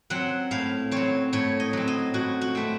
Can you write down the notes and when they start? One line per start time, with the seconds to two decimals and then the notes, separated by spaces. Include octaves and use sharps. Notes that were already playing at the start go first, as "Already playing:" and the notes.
0.10 F#3 C4 F#5
0.51 A2 F5
0.91 F#3 C4 C#5
1.33 A2 C#5
1.60 D#5
1.73 F#3 C4
1.88 D#5
2.14 A2 F#4
2.41 F#4
2.55 A3 C4